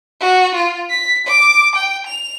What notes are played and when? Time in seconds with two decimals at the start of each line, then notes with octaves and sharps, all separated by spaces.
0.20 F#4
0.55 F4
0.90 B6
1.27 D6
1.76 G5
2.07 F7